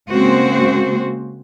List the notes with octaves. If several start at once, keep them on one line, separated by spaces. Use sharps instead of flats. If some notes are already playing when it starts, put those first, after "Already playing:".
C#3 G#3 A#3 C4 F#4 C5